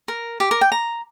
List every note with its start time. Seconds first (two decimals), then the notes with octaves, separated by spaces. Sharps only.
0.08 A#4
0.40 G4
0.51 A#4
0.61 G5
0.72 A#5